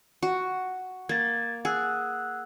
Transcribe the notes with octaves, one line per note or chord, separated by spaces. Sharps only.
F#4
A#3 G#6 A6
G#4 F#5 E6 F#6